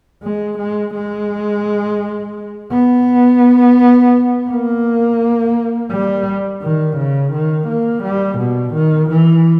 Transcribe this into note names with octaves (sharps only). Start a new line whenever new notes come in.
G#3
G#3
G#3
B3
A#3
G3
D#3
C#3
D#3
A#3
G3
B2
D#3
E3